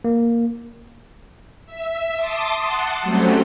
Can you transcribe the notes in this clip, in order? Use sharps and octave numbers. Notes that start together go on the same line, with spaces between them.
A#3
E5
A5 C6 D6 D#6
F#5 A5 C6
F#3 G3 A3 C4 C#4